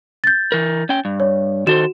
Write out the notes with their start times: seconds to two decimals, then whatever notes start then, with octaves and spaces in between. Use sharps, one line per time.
0.24 G6 A6
0.52 E3 A#4
0.89 C#4 G5
1.05 G2
1.20 C#5
1.67 D#3 F#4 A4 C5 E7